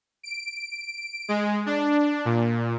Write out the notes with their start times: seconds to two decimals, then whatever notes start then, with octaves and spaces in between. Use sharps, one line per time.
0.23 D7
1.29 G#3
1.66 D4
2.25 A#2